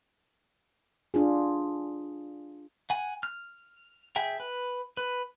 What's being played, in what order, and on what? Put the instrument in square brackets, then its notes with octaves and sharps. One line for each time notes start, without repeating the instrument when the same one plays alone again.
[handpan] D4 F4 G#4
[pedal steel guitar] F#5 G#5
F6
G#4 E5 G5
B4
B4